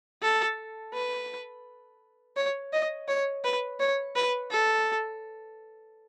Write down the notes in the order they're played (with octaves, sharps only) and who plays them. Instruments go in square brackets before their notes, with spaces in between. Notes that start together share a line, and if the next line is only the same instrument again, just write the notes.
[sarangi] A4
B4
C#5
D#5
C#5
B4
C#5
B4
A4